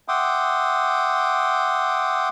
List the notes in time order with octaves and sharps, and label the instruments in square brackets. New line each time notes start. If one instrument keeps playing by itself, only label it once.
[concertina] E5 F#5 G5 C6 D6 D#6